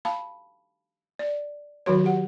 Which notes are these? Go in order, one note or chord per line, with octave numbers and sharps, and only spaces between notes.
F5 A5 B5
D5
D#3 F#3 F#4 C#5
G4 F#5